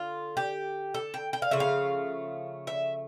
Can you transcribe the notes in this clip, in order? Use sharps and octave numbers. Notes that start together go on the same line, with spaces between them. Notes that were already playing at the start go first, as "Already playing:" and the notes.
Already playing: D3 F4
G4
A4
G5
G5
F5
C#3 F3 A3 E5
F5
E5